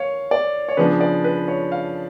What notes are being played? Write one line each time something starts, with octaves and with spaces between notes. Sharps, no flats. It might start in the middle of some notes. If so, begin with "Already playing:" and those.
Already playing: C#5 F5
D5
C#5
C#3 F3 B3 D4 B4
D5
B4
C#5
F5